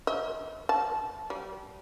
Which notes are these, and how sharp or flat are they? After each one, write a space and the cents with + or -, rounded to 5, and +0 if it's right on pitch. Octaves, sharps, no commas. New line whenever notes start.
D#5 +45
A5 -25
G3 -30